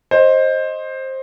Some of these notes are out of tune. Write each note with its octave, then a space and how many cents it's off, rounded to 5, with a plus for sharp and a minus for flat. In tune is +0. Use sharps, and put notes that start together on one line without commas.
C5 +15 D#5 +0